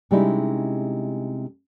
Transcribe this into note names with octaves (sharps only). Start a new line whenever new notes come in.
C3 G3 G#3 C#4 D#4 E4